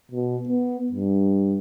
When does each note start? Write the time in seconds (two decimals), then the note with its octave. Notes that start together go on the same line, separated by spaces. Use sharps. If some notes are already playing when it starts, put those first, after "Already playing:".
0.11 B2
0.48 B3
0.92 G2